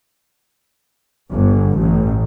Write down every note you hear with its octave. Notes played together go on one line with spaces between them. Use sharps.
G1
A1